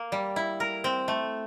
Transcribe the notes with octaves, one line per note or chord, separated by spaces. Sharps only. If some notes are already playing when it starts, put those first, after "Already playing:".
Already playing: A#3
G3
E4
A#4
C4
A3